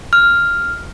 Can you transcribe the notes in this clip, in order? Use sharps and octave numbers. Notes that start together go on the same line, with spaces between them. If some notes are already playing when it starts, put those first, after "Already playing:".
F6